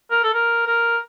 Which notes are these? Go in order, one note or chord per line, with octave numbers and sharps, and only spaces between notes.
A#4
A4
A#4
A#4